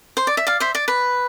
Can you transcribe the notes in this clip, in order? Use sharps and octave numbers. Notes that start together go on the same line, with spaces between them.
C5
D5
E5
D5 F5
C5 E5
D5
B4